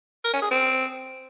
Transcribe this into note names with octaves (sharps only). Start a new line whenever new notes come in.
A#4
C#4
G#4
C4